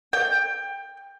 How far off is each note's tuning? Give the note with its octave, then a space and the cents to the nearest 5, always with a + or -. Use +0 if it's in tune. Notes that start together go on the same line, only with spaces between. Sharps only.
G5 +20